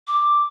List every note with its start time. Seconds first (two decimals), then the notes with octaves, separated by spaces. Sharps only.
0.07 D6